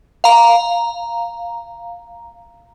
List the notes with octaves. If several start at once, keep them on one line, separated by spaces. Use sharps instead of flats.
F5 A#5